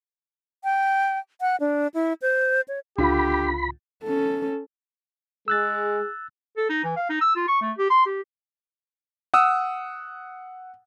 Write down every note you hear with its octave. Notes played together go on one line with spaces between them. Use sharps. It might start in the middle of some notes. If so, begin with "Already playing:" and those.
G5
F#5
D4
E4
C5
C#5
C#2 D3 F4 G4 B5
C#4 A4
G#3 G#4 E6 F#6 A6
A4
D#4
E3
F5
D#4
E6
F4
C#6
A3
G4
C6
G4
F#5 D#6 E6